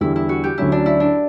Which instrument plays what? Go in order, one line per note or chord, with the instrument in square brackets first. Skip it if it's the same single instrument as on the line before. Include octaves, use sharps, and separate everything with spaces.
[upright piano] E2 D3 G3 [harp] E4
[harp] E4
F#4
G4
[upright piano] D2 D3 F#3 C#4 [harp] E4
[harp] D4
E4
D4